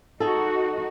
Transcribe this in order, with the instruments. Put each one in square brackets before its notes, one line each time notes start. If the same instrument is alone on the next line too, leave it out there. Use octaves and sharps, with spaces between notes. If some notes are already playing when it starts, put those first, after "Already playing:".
[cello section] D#4 F#4 [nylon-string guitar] G#4 A4